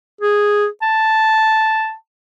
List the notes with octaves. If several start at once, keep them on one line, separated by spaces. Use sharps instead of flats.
G#4
A5